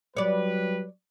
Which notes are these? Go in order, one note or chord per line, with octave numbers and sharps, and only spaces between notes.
F#3 G3 B4 C#5 D5